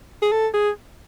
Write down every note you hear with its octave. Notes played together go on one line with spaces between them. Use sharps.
G#4
A4
G#4